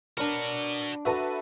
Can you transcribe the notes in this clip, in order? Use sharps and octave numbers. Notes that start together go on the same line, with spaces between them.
D4 F#4 A#4 B4 D5 B5
F#4 A4 B4 E5 A#5